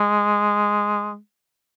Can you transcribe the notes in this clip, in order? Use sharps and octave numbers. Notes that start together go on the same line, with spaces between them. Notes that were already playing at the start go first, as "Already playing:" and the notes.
Already playing: G#3